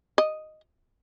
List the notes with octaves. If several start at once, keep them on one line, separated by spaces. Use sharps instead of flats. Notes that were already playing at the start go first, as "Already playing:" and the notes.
D#5